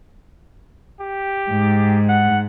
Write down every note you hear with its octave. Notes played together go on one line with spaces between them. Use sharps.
G4
G#2
F#5